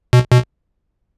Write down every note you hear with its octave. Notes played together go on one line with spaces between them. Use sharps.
B2
B2